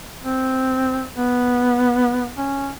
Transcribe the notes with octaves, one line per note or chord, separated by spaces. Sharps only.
C4
B3
C#4